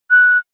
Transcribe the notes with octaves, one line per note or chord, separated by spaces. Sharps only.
F#6